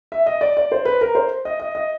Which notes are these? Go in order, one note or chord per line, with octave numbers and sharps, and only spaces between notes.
E5
D#5
D5
D5
C5
B4
A#4
C5
D#5
D#5
D#5